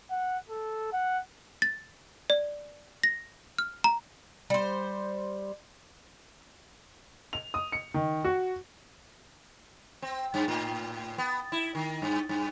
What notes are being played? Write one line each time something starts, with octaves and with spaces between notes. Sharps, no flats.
F#5
A4
F#5
A6
D5
A#6
F6
A#5
G3 C5
F7
D#6
C#7
D#3
F#4
C4
G2
A2
B3
E4
D#3
G2
G2